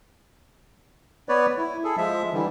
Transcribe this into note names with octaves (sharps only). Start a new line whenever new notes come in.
B3 B4 C#5 D5
E4
G#4 A4
F3 G#3 E5
D3 E3 G3